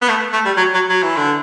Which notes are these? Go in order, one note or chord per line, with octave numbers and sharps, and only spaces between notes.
B3
A3
A3
G3
F#3
F#3
F#3
E3
D3